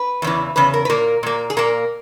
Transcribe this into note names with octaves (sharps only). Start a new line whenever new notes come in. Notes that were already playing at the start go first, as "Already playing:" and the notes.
Already playing: B4
E2 C#3 E3
E2 C#3 B4
A#4
B4
A#2 A#3 A#4
A#2 A#3
G#4
A#2 A#3 A#4